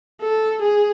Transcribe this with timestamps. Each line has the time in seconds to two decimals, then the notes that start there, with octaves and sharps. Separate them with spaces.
0.22 A4
0.62 G#4